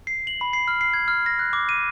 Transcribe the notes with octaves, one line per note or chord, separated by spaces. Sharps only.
C7
F#7
B5
C7
F6
C7
G#6
F6
A#6
F#6
D6
D#7